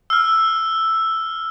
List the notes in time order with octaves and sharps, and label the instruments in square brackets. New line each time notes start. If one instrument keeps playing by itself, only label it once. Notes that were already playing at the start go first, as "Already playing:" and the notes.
[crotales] E6 F6